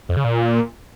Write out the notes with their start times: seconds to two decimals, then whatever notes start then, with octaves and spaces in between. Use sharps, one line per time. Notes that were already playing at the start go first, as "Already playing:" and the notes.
0.09 F2
0.17 C#3
0.24 A#2